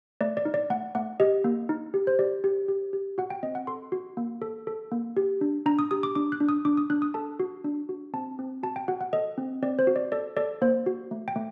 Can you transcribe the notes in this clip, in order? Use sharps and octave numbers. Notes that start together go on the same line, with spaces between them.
A3 D5
D5
D#4
D5
A3 F#5
A3 F#5
G4 D#5
A#3
D#4
G4
C5
G4 D5
G4
G4
G4
F#4 F#5
G5
C4 D#5
F#5
A4 C6
F#4
A#3
A4
A4
A#3
G4
D4
D4 A#5
D#6
G4 D#6
D6
D4 D6
F#6
D4
D#6
D4 D6
D#6
D4 F#6
D#6
A4 A5
F#4
D4
F#4
C4 A5
C4
F#4 A5
G5
F#4 F#5
F#5
A4 D#5
C4
C4 D5
C5
F#4
D5
A4 D5
A4 D5
A#3 C5
F#4
A3
G5
A3